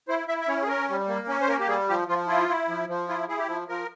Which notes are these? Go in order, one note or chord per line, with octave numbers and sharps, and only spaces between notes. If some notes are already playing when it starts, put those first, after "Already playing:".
E4 C5
E4 E5
E5
C#4 C#5
G#4
C#4 A#4
G3
A#3
C#4
C5
A#3 A#4
G4
G3 G#4
F3 G4
F3 F4
E4 F4
E4
F3
F3
E4 F4
E4 G#4
G4
F3
F3 A#4